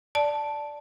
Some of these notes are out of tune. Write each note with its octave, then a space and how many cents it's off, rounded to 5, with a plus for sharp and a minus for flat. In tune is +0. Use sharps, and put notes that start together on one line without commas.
D5 +0 A5 +0